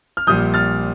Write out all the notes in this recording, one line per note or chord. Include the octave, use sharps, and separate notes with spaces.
F6
A#1 A#2 G3 D#6 G6
F6 A6